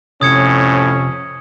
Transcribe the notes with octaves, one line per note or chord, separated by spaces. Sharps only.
F2 A2 C3 C#4 D#6 G#6 C#7